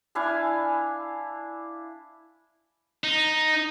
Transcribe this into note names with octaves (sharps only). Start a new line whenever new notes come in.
D4 E4 F5 G#5
D#4